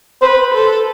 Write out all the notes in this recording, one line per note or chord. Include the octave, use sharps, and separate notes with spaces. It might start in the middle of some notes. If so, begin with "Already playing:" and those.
B4 C5
A4